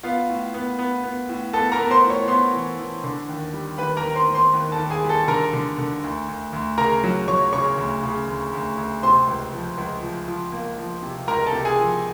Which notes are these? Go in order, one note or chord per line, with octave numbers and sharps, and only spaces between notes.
B3 F4 F5
A2
B3
B3
B3
A2
B3 A4 A5
A#4 A#5
B3
C5 C6
A2
C#5 C#6
B3 C5 C6
E3
E3
D3
D#2
G3
D#2 B4 B5
A#4 A#5
D#2
C5 C6
D#2
C5 C6
D#2
A4 A5
D#2
G#4 G#5
G3
A4 A5
D3 A#4 A#5
D3
D3
D2
D2
D2
C#3 A#4 A#5
F#3
F#3 C#5 C#6
C#3 C#5 C#6
D2
C#3
D2
D2
D2
C3 C5 C6
C#2
F3
C#2
F3
F3
A#3
F3
C3
C#2 A#4 A#5
A4 A5
C3
G#4 G#5
F3